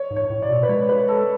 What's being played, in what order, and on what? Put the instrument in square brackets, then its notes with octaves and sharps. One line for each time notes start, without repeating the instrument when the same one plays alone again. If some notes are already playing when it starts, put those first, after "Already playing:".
Already playing: [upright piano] C#5
[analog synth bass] G#2
[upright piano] C#5
[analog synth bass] A2
[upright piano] D5
[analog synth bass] B2
[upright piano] B4
[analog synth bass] G#3 [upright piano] C#5
[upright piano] B4
A4